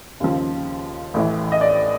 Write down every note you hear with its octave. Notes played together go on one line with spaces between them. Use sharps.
D#2 C#3 F3
A1 A2 E3
D#5
D5